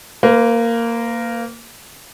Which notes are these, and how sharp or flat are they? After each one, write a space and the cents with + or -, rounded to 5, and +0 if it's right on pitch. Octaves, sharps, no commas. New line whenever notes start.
A#3 -10 B4 +35